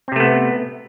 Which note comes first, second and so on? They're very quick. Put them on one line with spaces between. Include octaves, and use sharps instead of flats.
C4 C3 A3 B3